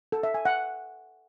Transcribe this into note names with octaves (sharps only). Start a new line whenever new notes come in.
A4
E5
G#5
F#5